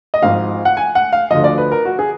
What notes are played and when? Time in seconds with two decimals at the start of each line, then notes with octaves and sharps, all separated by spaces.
0.14 D#5
0.22 G#1 G#2 F3 F5
0.65 F#5
0.77 G#5
0.95 F#5
1.13 F5
1.31 D2 D3 F3 D#5
1.44 D5
1.58 B4
1.71 A#4
1.85 F#4
1.99 G#4